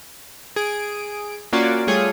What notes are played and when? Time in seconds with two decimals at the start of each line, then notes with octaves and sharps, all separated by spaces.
0.56 G#4 D7
1.53 A#3 C#4 F4 F#4 D5
1.87 G3 A3 F4 G#4 C#5